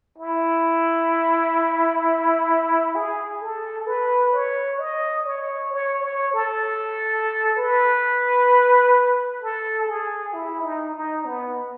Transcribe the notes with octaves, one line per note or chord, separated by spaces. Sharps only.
E4
G#4
A4
B4
C#5
D#5
C#5
C#5
C#5
A4
B4
A4
G#4
E4
D#4
D#4
B3